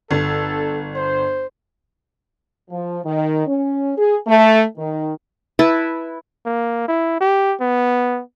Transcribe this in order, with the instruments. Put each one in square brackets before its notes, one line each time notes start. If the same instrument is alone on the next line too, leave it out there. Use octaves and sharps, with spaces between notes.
[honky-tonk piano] G1 [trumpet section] A4
[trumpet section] C5
[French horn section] F3
D#3
C#4
G#4
A3
D#3
[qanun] E4 B4 E5 A5
[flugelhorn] A#3
E4
G4
B3